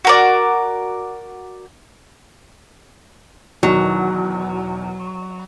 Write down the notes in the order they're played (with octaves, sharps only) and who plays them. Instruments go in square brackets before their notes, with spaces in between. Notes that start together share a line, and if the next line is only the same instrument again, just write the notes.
[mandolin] F#4 A#4 D5
[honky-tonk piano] E2 B2 D#3 [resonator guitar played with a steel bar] F#3